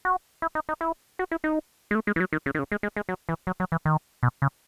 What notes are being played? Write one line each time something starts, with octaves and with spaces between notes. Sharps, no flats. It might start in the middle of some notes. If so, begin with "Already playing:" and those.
F#4
E4
D#4
D#4
E4
F#4
E4
D#4
G#3
A3
G#3
E3
F#3
D#3
C#3
D#3
C#3
G#3
G#3
G#3
F#3
E3
F#3
F#3
E3
D#3
B2
C#3